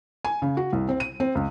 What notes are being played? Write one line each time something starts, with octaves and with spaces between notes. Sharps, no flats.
G#5
C#3
F#4
C2
C4
D#7
C4
C#2